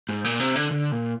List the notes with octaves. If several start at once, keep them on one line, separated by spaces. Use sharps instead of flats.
G#2
A#2
C3
D3
D3
A#2